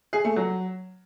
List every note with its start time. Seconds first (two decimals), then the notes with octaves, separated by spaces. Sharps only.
0.13 G#4
0.25 A3
0.36 F#3